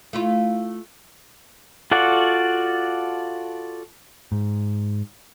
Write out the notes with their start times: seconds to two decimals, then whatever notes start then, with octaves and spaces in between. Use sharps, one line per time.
0.13 A3 E4 F4
1.91 F4 F#4 A4 D5 F#5
4.32 G#2